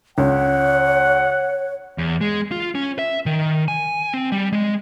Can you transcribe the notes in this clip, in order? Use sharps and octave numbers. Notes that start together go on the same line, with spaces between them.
C#2 C#5 F#5
E2
G#3
F4
C#4
E5
D#3
G#5
C4
G3
G#3